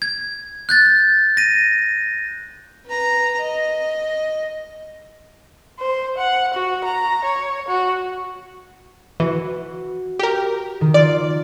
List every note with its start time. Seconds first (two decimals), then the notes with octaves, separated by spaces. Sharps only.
0.02 G#6
0.69 F#6 G6 A6
1.37 A#6 D#7
2.86 B4 A#5
3.39 D#5
5.80 C5
6.18 F#5
6.54 F#4
6.85 A#5
7.25 C#5
7.68 F#4
9.20 E3 F#4
10.19 G4 A#4
10.81 D#3
10.94 F4 D5